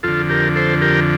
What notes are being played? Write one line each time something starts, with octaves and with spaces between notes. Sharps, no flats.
F2 D3 F4 A4
G4 A#4
A4 C5
G4 A#4